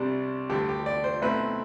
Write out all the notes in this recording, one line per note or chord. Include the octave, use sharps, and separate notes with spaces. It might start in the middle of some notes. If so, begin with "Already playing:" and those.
Already playing: C2 C3 G3 D4
D2 D3 G3 G4
G4
D5
C5
B1 B2 A3 C4 E4 B4